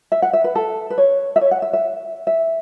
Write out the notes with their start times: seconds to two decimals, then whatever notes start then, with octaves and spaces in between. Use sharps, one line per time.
0.12 E5
0.22 F#5
0.33 E5
0.44 B4
0.55 A4
0.90 B4
0.98 C#5
1.36 E5
1.41 C#5
1.51 F#5
1.62 E5
1.73 E5
2.27 E5